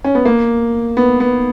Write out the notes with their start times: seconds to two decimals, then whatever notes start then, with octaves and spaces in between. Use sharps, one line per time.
0.04 C#4
0.15 B3
0.25 A#3
0.97 B3
1.20 B3